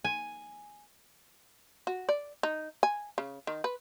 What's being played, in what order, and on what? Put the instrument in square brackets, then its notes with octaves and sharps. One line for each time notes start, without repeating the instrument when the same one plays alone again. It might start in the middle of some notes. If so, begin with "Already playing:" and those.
[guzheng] G#5
[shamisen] F#4
D5
D#4
G#5
C#3
D#3
B4